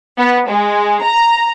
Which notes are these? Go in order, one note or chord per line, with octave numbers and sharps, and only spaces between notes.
B3
G#3
A#5